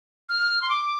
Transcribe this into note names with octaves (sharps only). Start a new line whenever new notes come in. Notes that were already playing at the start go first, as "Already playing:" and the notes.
F6
C6
D6